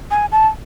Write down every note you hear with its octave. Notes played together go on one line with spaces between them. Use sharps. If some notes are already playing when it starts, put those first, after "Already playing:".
G#5
A5